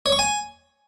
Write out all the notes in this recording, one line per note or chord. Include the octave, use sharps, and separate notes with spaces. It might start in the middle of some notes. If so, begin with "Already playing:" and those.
C#5
C#6
G#5